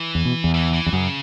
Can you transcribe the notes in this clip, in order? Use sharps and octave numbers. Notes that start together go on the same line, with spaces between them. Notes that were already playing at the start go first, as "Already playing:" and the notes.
Already playing: E3
E2
B2
E2
E3
E3
E2
F#2 C#3